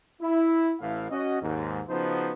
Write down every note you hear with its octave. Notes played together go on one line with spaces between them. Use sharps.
E4
A1 A2 E3 F5
C#4 F#4 D#5
D#2 G#2
C#3 F3 B3 D#4 F#4 C5